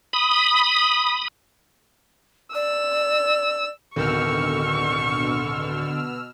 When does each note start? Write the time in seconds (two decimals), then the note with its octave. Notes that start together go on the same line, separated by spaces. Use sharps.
0.13 B5 D#6
2.55 D5 E6
3.96 D1 B2 D3 D#3 C#6 E6 F6